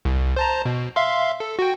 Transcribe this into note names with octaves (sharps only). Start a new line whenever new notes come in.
C2
C5 A5 A#5
B2
E5 F5 C6
A4
F#4 G5